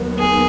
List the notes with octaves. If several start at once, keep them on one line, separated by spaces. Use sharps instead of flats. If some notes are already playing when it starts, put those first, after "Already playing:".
Already playing: D#2 D#3 F#3 B3
G#4